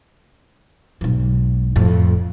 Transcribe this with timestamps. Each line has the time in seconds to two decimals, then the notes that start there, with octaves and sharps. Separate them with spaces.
1.01 B1 G#2
1.76 F2 A2